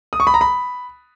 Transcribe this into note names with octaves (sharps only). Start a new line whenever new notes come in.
D#6
C#6
B5
A#5
B5